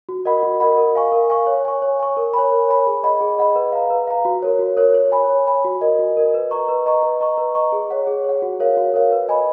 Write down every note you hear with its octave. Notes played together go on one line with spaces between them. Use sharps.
F#4
A#4 D#5 F#5 B5
F#4
A#4 D#5 F#5 B5
A#4
F5 G#5 C#6
A#4
F5 G#5 C#6
C#5
G#5 C#6
C#5
G#5 C#6
A#4
C#5 G#5 B5
A#4
C#5 G#5 B5
G#4
D#5 F#5 B5
G#4
D#5 F#5 B5
B4
F5 A#5
B4
F5 A#5
F#4
A#4 C#5
F#4
A#4 C#5
C#5
G#5 B5
C#5
G#5 B5
F#4
A#4 D#5
F#4
A#4 D#5
B4
D#5 A#5 C#6
B4
D#5 A#5 C#6
B4
D#5 A#5 C#6
B4
D#5 A#5 C#6
G#4
C#5 F#5
G#4
C#5 F#5
F#4
A#4 C#5 F5
F#4
A#4 C#5 F5
B4
D#5 G#5 B5